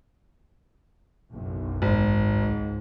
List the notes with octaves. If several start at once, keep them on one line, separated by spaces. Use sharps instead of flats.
F#1 B1 F#2
G#1
C#2 G#2